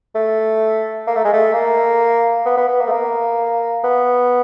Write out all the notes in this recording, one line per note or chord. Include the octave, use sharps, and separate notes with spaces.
A3
A#3
A3
G#3
A3
A#3
B3
B3
B3
A#3
A3
A#3
B3